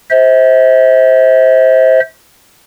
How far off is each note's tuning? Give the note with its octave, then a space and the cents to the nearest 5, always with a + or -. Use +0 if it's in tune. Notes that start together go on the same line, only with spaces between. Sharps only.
C5 +0 E5 -40